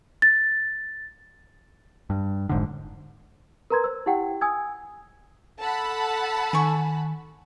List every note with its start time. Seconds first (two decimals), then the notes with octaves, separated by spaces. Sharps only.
0.22 A6
2.10 G2
2.49 F1 G#2 D3
3.70 A#4 B4 A#5 C6 G#6
3.84 C5 E6
4.06 E4 G4 F#5 G5
4.41 G#5 D#6 E6 G#6
5.60 A4 F#5 A5 B5
6.53 D#3 G#5 C#6